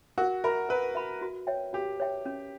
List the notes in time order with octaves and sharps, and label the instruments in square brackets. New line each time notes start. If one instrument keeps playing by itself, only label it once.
[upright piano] F#4 [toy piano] A#4
[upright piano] A#4 [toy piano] E5 B5
[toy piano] A#4 [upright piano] B4
[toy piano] E5 B5
F#4
C#5 E5 G5
[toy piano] F#4 [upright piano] G4
[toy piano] C#5 E5 G5
C#4